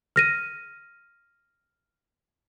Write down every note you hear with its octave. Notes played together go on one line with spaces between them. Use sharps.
F6 A#6 D#7